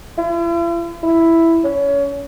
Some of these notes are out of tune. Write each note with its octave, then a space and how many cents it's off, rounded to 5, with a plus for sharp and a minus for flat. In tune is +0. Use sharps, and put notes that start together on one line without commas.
E4 +45
E4 +5
C#4 +25